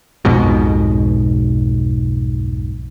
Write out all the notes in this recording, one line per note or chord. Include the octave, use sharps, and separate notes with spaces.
B1 F2 G#2 B2